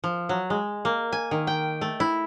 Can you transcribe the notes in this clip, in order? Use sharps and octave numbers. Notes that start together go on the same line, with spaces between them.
F3
F#3
G#3
A#3
G#5
D#3
G5
A3
E4